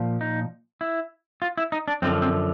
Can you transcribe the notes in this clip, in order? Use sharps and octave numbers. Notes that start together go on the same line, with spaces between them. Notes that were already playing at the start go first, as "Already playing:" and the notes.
Already playing: A#2 F3
D#4
E4
F4
E4
D#4
D4
F#2 D3 F3 C4
C4